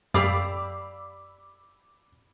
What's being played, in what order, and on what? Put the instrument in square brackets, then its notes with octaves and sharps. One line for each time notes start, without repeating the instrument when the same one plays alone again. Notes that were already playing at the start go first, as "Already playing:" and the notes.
[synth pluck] F#2 [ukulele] G4 D5 F5 [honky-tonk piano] B5 D6 E6